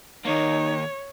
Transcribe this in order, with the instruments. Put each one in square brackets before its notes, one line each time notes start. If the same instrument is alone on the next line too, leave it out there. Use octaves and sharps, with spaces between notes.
[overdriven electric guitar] D#2 A#3 [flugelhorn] D#4 [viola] C#5